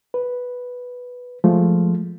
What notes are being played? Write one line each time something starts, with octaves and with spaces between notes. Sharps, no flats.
B4
F3 G#3 A3